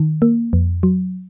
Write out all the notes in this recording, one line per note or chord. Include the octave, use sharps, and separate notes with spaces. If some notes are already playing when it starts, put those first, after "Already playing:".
Already playing: D#3
A#3
F2
F#3